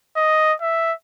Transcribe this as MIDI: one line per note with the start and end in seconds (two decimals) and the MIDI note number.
0.16 0.53 75
0.61 0.93 76